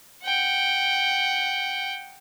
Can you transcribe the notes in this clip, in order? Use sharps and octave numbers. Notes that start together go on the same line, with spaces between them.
F#5 G5